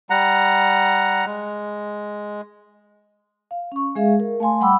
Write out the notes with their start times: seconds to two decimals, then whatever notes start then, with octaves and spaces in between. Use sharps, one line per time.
0.10 G3 F#5 A#5
1.26 G#3
3.51 F5
3.72 C#4 C#6
3.96 G#3 G#4 E5 F5
4.20 A#4
4.40 A3 F5 G#5 C6
4.61 G3 F#5 G5 B5 D6 E6